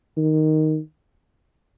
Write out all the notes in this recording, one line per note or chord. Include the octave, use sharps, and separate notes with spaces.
D#3